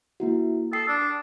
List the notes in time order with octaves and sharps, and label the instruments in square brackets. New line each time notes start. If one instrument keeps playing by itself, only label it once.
[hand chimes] A#3 E4 F#4
[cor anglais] A4 [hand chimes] G5 D#6 C7
[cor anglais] D4